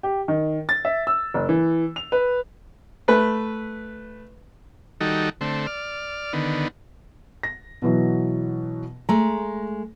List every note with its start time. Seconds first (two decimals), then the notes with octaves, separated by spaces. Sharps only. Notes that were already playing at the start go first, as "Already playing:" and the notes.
0.03 G4
0.28 D#3
0.69 A6
0.85 E5
1.07 E6
1.34 F#1
1.49 E3
1.96 F7
2.12 B4
3.08 A3 B4
5.01 D#3 G3 D#4 F#4 A4
5.41 D3 A3 C4
5.67 D5 F6
6.33 D3 D#3 B3
7.43 A#6
7.82 B2 E3 F#3
9.09 G#3 A3 A#5